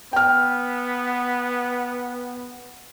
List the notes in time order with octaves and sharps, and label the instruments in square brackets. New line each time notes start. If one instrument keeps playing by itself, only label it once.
[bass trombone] B3 [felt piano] G5 F6